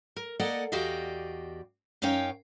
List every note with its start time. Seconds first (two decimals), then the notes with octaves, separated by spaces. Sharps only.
0.16 A#4
0.40 A#3 A4 D5 D#5 F#5
0.72 E2 F#4 G4 D5 D#5 F5
2.02 F#2 C#4 D#4 C#5 F5 G5